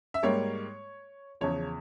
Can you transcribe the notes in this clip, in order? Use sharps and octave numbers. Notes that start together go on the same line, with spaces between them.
E5
G#2 G3 A#3 C#5
E2 C#3 F3 C#5